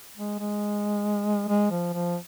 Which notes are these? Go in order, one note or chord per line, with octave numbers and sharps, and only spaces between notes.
G#3
G#3
G#3
F3
F3